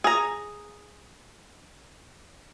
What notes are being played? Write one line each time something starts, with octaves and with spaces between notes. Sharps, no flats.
G#4 A#5